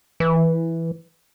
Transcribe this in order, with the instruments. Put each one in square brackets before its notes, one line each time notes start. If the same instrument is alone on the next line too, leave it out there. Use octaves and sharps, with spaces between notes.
[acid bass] E3